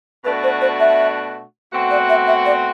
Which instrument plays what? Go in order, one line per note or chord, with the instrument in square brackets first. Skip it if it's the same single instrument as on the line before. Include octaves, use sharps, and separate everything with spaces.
[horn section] B2 A3 D4 F#4 [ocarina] B4
[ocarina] C5
C5
E5
[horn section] B2 A3 C4 F#4
[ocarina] D5
E5
E5
D5